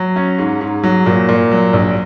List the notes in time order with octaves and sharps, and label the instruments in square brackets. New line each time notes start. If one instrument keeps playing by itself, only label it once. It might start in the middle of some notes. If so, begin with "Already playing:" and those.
Already playing: [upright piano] F#3
C#4
G#2
G#2
F#3
A#2
A#2
F#3
A#1